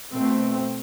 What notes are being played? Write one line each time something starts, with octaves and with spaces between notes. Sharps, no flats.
B2 A3 C4